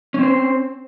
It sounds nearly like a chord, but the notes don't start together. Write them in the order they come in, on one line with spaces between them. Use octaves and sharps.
C#4 C4 C5